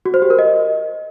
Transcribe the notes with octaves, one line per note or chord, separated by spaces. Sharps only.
F#4
C5
G4
A#4
D#5